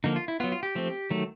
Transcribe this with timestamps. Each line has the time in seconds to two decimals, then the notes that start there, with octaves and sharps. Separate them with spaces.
0.04 D3 F3 A#3 D#4
0.16 F4
0.28 E4
0.40 B3 F4
0.44 F#3
0.52 F4
0.63 G4
0.75 F3 A3 C4
1.10 D#3 F#3 A3